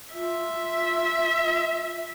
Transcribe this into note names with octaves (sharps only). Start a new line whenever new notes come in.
F4 E5